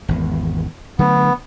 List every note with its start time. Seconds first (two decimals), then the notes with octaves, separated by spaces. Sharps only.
0.09 G#1 E2
0.99 D3 F#3 A3 B3